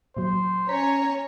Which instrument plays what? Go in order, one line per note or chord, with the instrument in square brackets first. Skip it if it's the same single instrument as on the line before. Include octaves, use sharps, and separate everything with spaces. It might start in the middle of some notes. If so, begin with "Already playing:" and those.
[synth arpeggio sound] A#2 F#3 [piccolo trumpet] C5
[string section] C#4 C#5 [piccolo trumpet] A#5 [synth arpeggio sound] B6